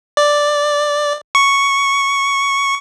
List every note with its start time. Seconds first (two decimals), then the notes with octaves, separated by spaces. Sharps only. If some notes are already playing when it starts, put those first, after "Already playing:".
0.17 D5
1.35 C#6